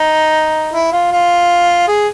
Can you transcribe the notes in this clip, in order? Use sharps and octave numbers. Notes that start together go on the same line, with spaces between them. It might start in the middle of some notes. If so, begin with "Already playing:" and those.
Already playing: D#4
E4
F4
F4
G#4